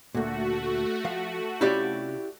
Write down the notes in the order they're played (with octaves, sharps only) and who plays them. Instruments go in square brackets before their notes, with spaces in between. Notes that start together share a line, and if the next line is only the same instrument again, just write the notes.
[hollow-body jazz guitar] D2 A#2 [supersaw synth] A3 F#4
[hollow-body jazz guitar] F3 F5
[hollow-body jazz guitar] C3 C#4 F4 [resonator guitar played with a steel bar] E4 G4 D5